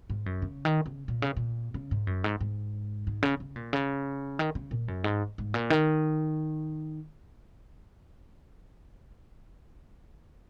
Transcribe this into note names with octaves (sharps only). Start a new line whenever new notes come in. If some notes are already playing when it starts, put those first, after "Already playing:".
G#2
F#2
C#3
D#3
C#3
A#2
C#3
A#2
C#3
G#2
F#2
G#2
G#2
G#2
C#3
C#3
A#2
C#3
D#3
C#3
A#2
F#2
G#2
G#2
A#2
D#3